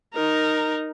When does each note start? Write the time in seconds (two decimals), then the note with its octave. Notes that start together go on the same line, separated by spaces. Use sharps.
0.14 D#4 A#4